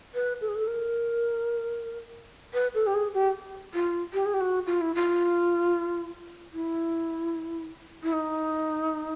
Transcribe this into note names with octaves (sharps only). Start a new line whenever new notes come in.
B4
A4
G#4
A4
A#4
B4
A4
G4
G#4
G4
F4
G4
G#4
G4
F#4
F4
E4
F4
E4
E4
D#4